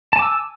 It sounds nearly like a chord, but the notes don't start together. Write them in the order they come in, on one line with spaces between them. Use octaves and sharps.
A5 G#5 D6 E6